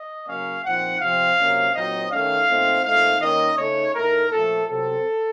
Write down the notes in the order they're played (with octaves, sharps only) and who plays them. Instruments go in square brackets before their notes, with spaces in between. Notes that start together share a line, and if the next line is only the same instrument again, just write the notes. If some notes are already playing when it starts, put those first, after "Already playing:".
Already playing: [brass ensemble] D#5
C#3 F#3 A#3 C#4 F5
A#2 F3 C4 D#4 F#5
C3 F3 C4 F5
C3 F#3 A#3 C#4
A#2 F#3 C4 D#4 D#5
D#3 A3 C#4 F5
A#2 A3 C4 D#4
A#2 A3 C4 D#4 F5
D#3 A#3 C#4 D#5
C#3 A3 D#4 C#5
A2 A3 D#4 A#4
A#2 F3 A3 A4
C3 F#3 C4 A4